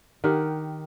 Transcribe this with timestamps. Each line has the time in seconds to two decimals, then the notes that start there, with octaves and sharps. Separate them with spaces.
0.24 D#3 G4 A#4 F#5